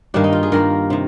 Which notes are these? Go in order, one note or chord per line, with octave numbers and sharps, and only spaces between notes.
G2 D#3 A#3 D4
D#4
F4
G#4
G2 D#3 A#3 A#4
C3 D#3